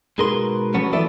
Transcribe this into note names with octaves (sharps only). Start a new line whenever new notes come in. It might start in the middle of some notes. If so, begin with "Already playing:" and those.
G#2 B2 G#4 A#4 B4 C6
F3 F#3 A3 B3 C#4
E3 B3 A4 B4 D5 E5